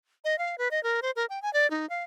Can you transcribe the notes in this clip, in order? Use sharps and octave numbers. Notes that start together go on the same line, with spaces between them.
D#5
F5
B4
D#5
A#4
C5
A#4
G5
G#5
D5
D#4
F5